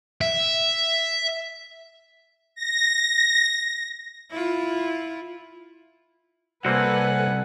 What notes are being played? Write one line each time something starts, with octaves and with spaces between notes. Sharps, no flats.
E5
A#6
E4 F4
C2 A#3 C4 F#4 A4 B4 F#5 G#5